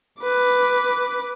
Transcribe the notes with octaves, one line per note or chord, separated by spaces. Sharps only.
B4 D6